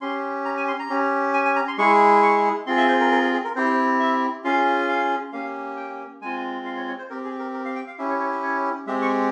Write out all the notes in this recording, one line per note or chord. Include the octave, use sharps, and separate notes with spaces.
C#4 G4 C6
A#5
G#5
C6
A#5
C#4 G4
G#5
G#5
A#5
C6
G#3 E4 G#4 C#6
C#6
C4 F4 G#4 C6
E5
C5
A#4
A#4
G#4
G#4
A#4
C4 E4 G4 C5
E5
C#4 F4 G#4 F5
F5
A#3 C#4 G4 F5
G5
G#3 C4 F4 G#5
F5
C#5
C#5
C5
C4 G4 A#4
G#4
A#4
A#4
F5
G5
F5
C#4 E4 G4 E5
C#5
C#5
E5
C#5
G#3 C4 G4 E5
C#6